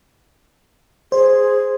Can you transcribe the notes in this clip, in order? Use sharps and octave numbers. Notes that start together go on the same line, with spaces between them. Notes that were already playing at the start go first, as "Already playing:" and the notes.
G#4 C5